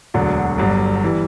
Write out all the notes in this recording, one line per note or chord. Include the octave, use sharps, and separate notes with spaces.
E1 D2 D3 F#3
G1 G2 F#3
E3 G3